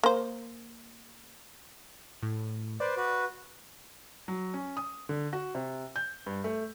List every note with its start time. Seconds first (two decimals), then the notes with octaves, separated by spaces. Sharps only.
0.03 A#3 C5
2.22 A2
2.80 B4 C5 D5
2.97 F#4 B4
4.28 F#3
4.54 C#4
4.77 D#6
5.09 D3
5.33 F#4
5.55 C3
5.96 G6
6.26 G2
6.44 A3